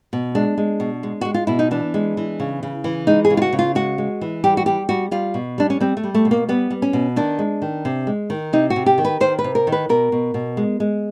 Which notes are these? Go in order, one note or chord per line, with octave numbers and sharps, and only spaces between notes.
B2
G#3 D4
G#3
B2
G#3
G#3 F#4
F4
B2 E4
D#4
E3 D4
G#3
E3
C#3
C#3
E3
G#3 D#4
G#4
C#3
F4
F#4
C#3
F4
G#3 F#4
G#3
E3
G3 G4
F#4
G3 G4
G3 F#4
G3 F4
B2
G3 D4
C#4
G3 C4
A3
G3
A3
B2
A#3
G3 B3
G3
C#4
B2
D#3 D4
G#3
D#3
C3
G#3
D#3
C3 D#4
F#4
C3
G4
D#3
B4
D#3 C5
B4
C3
A#4
D#3
B4
B2 A#4
B2
B2
G#3
G#3